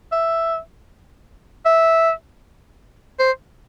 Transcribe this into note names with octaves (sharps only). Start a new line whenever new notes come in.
E5
E5
C5